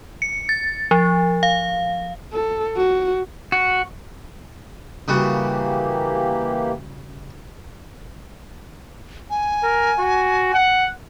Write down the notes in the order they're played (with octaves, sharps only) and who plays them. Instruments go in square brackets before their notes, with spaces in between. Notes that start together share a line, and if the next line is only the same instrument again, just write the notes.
[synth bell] C#7
A6
F3
F5
[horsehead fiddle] A4
F#4
[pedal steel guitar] F#4
[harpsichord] C#3 G3 F#4 [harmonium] E3 A#3 G4
[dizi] G#5
[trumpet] A#4
F#4
F#5